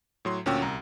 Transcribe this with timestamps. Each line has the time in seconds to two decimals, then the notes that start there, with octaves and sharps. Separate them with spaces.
0.25 A2 F#3 C6
0.46 D2 A#2 C#4 F#4 G5 E6
0.62 C2 A#5